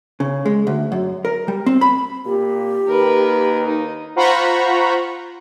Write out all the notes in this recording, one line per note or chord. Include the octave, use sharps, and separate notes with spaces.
C#3
G#3
D2
F#2
A#4
G3
C4
B5
A#2 G4
D#2 A#4 B4
D#4
F4 C5 F#5 A#5 B5 C#6